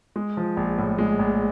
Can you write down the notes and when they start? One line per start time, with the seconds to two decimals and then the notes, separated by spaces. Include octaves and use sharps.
0.16 G#3
0.37 F3
0.57 A#1
0.78 A2
0.98 G#3
1.19 A#1